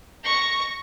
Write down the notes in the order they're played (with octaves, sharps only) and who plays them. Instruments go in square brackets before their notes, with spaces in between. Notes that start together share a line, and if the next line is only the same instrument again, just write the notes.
[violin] C#6 A#6